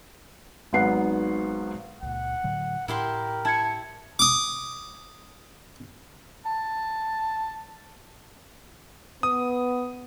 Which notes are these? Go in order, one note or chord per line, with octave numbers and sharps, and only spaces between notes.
G#1 G#2 F#3 B3 F#5 C7
C#2 A#2 F#5
A2 D3 F#3
A2 E4 G4 A#4 C6
E4 A5 G#6 C#7
D6 D#6
A5
B3 D#6